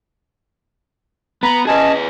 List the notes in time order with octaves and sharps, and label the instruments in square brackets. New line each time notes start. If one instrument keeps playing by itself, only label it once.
[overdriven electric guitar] B3 [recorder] A#5 [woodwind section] B5
[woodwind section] C#4 D#5 [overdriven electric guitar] G#4 B4 [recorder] A5